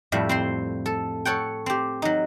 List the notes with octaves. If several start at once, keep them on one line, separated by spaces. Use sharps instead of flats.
F2 A2 G3 E5
C4 C5 C6
A4
A4 C#5 F#5 G5
C4 G4
F#3 D#4